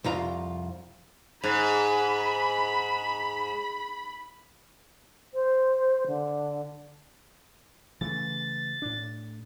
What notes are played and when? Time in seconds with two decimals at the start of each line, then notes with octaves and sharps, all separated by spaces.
0.04 C2 F2 F4 A#5
1.44 G#2 B5
5.34 C5
6.07 D3
8.01 C#3 E3 A3 A6
8.82 A2 D4